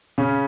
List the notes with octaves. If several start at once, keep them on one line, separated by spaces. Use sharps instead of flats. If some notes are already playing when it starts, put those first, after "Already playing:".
C#3 C#4